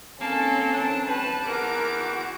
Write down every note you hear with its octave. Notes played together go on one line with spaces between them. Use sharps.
A#3 C4 C#4 A4 A#4 A5
D4 A5
G2 B4 A5
E2 A#4 F#5 D6
F#4